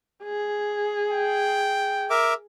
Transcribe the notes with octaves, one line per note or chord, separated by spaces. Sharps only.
G#4
G5
A#4 E5 D6